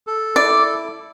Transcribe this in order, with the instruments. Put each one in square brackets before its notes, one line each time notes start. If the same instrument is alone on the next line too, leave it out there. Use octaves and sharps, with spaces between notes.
[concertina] A4
[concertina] E4 [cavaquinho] D5